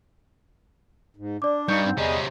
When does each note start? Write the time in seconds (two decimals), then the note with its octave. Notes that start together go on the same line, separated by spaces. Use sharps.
1.17 G#2
1.42 D4 D5 D6
1.68 G2 D#4 C#6 G6
1.86 G#2 C4
1.98 E2 C3 G3 C#4 G#4 D#5